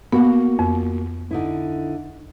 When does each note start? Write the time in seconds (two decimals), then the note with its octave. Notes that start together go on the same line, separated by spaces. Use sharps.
0.12 A#3 B3 F#4
0.59 F2
1.31 D3 D#4 E4